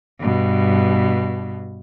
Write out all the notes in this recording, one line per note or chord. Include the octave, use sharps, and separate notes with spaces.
G2 B2